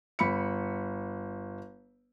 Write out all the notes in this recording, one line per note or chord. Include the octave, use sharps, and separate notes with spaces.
G1 B5 C#7